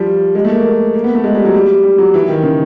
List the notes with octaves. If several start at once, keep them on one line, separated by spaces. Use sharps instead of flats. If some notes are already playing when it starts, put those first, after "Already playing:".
Already playing: F3 G3
G#3
A3
A#3
A#3
B3
A3
G#3
G3
F#3
G3
G3
F#3
E3
D#3
C#3